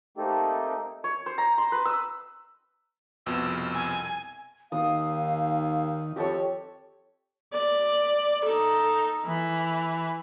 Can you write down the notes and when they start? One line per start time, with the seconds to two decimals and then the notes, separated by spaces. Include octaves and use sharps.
0.17 A3 A#3 C4 D#4 G4 A4
1.04 C#5
1.26 C5
1.38 A#5
1.58 C6
1.72 B4
1.85 E6
3.26 C2 F2 B2 E6
3.74 G#5
4.72 D#2 D#3 F5 D#6
6.16 F2 G4 A4 C#5
7.53 D5
8.44 D#4 A4
9.25 E3